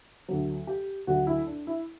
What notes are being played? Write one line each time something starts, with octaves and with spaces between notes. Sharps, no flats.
D2 D3 F#3
G4
D2 D3 F#3 F#4
E4
D4
E4